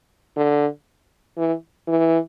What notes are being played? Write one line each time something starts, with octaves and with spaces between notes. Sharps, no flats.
D3
E3
E3